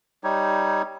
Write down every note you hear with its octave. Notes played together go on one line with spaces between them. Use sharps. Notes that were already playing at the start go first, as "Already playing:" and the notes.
G3 D#4 C#5